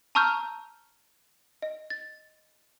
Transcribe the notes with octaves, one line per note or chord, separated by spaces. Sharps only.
A5 A#5 C#6 E6 F6 G6
D#5
A6